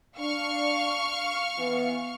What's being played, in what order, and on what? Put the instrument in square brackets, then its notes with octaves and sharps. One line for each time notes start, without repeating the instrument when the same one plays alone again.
[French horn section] D4 [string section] F5 C#6 F6
[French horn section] E3 B3